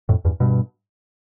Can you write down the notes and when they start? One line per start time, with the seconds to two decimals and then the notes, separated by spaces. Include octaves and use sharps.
0.09 F2 A2
0.25 E2 G2
0.40 G2 B2